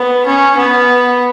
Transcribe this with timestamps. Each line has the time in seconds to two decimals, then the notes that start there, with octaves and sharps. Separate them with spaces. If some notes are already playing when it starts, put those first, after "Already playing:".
Already playing: B3
0.26 C#4
0.58 B3